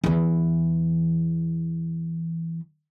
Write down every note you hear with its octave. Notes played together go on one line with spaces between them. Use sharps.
E2 E3